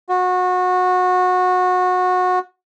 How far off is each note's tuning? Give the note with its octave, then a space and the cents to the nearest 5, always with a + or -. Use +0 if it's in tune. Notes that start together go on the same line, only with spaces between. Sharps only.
F#4 -25